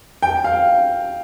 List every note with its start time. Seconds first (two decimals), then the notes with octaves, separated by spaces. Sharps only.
0.22 G5
0.44 F5